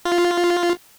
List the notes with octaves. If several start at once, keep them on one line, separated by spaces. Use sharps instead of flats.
F4